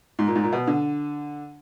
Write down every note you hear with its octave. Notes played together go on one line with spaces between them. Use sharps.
G#2
A#2
G#2
A#2
B2
D3